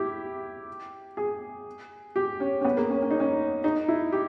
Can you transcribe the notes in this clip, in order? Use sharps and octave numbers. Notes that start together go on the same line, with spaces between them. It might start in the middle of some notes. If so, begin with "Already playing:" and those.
Already playing: E4 G4
G#4
G4
C#4
C#4
B3
A#3
C#4
C#4
D#4
C#4
D#4
E4
G4